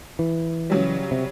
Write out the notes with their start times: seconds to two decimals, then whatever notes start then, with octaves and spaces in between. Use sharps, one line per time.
0.19 E3
0.70 C#3 F#3 G3
1.11 C3